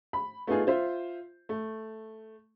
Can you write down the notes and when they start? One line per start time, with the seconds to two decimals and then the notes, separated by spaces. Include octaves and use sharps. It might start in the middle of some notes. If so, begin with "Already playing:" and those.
0.13 B5
0.47 A3 B3 D#4 F4 G#4
0.67 F4 C5 E5
1.49 A3